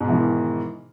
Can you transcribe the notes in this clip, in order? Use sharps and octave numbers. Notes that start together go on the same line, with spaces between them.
G#2 B2 D#3 E3